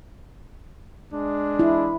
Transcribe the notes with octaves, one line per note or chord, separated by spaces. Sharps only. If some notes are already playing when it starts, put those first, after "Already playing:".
G#3 D4
E4